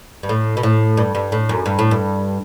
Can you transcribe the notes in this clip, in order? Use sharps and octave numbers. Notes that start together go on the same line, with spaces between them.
G2
A2
B2
A2
G2
G2
A2
F#2
G2
A2
G2